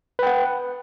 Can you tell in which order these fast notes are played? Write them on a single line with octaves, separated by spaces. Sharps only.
B4 G5 F#5